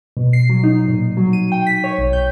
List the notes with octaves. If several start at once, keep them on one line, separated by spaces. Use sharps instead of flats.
B2
C7
F#3
D#4
A#2
F#3
D#7
G5
B6
C#5
B1
G6